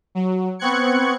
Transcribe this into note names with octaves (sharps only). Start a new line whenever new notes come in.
F#3
B3 C4 C#6 F#6 G#6 C#7